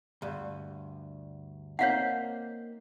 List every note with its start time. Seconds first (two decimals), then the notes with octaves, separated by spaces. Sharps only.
0.22 D2 G2
1.79 A#3 C4 D#4 C#5 F5 F#5